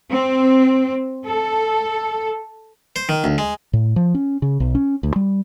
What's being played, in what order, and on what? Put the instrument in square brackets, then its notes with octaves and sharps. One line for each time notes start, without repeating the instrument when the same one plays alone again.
[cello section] C4
A4
[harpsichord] C5
D#3
D2
G#3
[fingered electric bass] A2
F3
C#4
C#3
B1
C#4
D2
G3